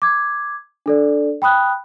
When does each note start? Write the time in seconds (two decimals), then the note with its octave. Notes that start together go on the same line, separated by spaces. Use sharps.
0.02 D6 G#6
0.86 D4 A4 D5
1.42 G5 B5 D#6 F#6